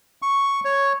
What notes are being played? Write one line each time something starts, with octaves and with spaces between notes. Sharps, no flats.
C#6
C#5